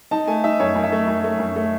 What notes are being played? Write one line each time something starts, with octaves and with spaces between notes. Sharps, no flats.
D#4 A5
A3 G#5
D#4 E5
F#2 C#5
F#2
E5
A3
F#2
A3
F#2
A3